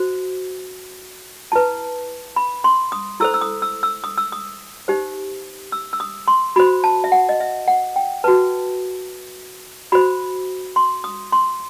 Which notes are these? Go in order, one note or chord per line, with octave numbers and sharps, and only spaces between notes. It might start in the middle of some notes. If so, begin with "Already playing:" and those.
Already playing: F#4 C5
E4 B4 A5
B5
C6
D#6
E4 A4 C5 E6
E6
D#6
E6
E6
D#6
E6
D#6
D#4 G4 C5
E6
E6
D#6
C6
F#4 C5 B5
A5
E5
F#5
D#5
E5
F#5
G5
F#4 B4 A5
F#4 C5 B5
C6
D#6
C6